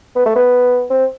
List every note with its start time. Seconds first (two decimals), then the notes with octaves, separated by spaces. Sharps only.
0.15 B3
0.26 A3
0.36 B3
0.90 C4